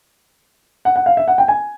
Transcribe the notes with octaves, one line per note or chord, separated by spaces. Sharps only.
F#5
F#5
F5
E5
F#5
G5
G#5